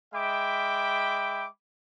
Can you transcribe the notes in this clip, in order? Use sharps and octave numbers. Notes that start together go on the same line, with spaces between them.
G#3 E5 G5 B5 D6